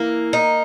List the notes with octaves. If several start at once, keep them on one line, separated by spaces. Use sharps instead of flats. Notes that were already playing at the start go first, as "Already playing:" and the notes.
Already playing: E3 A#3
D#4